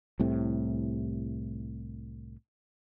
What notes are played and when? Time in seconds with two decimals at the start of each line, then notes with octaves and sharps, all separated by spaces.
0.19 C2 A2 C3